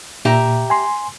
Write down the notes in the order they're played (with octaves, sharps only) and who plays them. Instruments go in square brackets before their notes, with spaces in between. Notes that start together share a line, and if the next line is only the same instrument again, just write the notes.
[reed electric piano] A#2 [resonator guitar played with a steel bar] G4 E5 A#5
[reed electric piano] G#5 C6